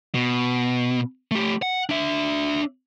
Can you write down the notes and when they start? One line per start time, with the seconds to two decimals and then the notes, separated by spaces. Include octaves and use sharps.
0.15 B2
1.31 A3 G4
1.62 F#5
1.89 D4 E5